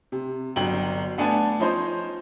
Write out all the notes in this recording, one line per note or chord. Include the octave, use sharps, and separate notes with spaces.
C3
G1 D3 F#3 G5 F#7
A3 B3 D4 G#5 A5
F3 C#4 D#4 C5